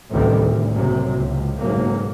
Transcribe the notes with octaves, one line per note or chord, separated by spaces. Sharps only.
A1 D2 C3 D#3 G3
D2
F#1 C2 F#2 C3 F#3
C#2
F#1 B1 G#2 F#3 A#3